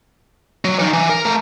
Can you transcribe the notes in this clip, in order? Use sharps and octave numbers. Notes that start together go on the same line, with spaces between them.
F#3
E3 D#4
E3
A#4
A3 A#5